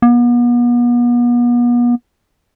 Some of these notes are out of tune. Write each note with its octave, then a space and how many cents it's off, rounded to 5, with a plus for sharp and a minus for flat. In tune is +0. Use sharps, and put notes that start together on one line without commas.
B3 -40